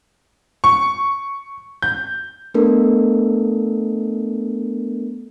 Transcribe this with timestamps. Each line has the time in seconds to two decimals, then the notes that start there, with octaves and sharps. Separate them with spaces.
0.64 C#6
1.82 G6
2.54 A3 B3 D4 A4 A#4